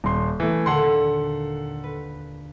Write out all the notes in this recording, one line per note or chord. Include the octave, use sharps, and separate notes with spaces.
D#1 C6
E3 A3
D#2 A#2 D3 A4 F#5 C6
B4